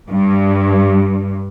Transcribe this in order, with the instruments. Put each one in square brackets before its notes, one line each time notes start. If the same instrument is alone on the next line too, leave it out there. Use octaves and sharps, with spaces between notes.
[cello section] G2